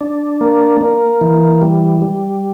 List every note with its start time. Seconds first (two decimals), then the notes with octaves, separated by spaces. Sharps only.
0.01 D4
0.41 A#3
0.81 A#3
1.21 E3
1.62 G3
2.02 G3